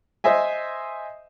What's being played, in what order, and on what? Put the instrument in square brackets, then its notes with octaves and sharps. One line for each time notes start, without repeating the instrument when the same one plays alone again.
[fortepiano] C5 D#5 E5 G#5